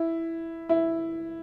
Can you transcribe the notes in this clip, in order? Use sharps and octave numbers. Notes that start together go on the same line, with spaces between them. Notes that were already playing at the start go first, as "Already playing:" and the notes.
Already playing: E4
E4